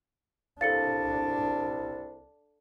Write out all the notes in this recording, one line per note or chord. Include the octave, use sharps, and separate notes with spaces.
C2 D4 A4 F5 A6 C#7